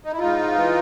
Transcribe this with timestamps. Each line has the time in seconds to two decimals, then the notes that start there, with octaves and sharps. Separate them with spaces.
0.04 D#4
0.12 E4
0.19 G#2 D#4 F4
0.55 E3